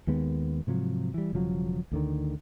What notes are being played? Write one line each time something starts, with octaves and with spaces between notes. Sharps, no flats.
D#2 D#3 G#3 B3
G#2 C3 F3 F#3
E3 G3
E1 C#3 F3 F#3
D2 D3 D#3